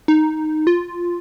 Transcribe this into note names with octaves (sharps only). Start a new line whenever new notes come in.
D#4
F4